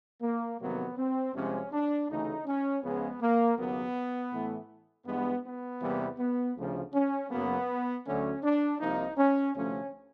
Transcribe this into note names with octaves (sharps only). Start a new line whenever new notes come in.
A#3
F2 C3 D#3 F#3 A#3 B3
C4
C2 C3 F3 G#3 C#4
D4
D2 C#3 E3 A3 D#4
C#4
C#2 C#3 F3 G#3 B3
A#3
D#2 C#3 F#3 A#3 B3
A2 E3 A3
G2 E3 G#3 B3
B3
E2 C3 E3 G3 A#3
B3
D2 C#3 F3
C#4
F#2 C#3 F#3 A#3 B3
D2 D3 F#3 A3 C#4
D4
C2 C3 F3 A#3 D#4
C#4
D2 C3 F3 A3 C#4